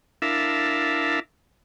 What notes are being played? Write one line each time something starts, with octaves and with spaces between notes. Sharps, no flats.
D4 E4 A#4 E5 F5 A5